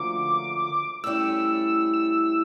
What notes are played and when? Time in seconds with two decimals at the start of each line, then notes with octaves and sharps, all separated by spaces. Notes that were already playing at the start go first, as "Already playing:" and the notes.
Already playing: D2 D3 F3 A#3 C#4 D6
1.04 A2 G3 C#4 E4 E6
1.93 E6